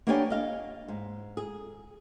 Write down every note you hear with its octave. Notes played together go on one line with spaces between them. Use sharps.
A#3 B3 D4 G4 C#5 G#5
D#5 F5 G#5
G#2
G#4